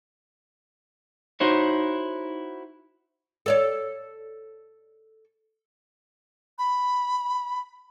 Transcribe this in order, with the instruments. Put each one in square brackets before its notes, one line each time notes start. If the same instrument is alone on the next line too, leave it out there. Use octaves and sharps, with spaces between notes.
[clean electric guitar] D#4 E4 F#4 C5 C#5
[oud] A4 C#5 D5
[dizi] B5